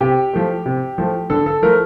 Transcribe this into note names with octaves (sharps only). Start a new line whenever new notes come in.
C3 G4
F3 A3
C3
F3 A3
D3 A4
A4
F3 A3 A#4